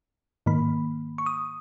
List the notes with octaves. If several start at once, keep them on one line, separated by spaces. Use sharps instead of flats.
G#2 D#3 A#3 B5
C#6
D#6